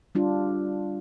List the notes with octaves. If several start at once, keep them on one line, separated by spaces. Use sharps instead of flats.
G3 D4 F4